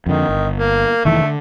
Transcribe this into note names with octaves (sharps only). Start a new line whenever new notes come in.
F2 D3 D#3
G1
A#3
F1 D#3 E3 A3
D3